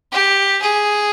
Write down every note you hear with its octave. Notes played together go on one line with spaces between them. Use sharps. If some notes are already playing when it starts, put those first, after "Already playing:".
G4
G#4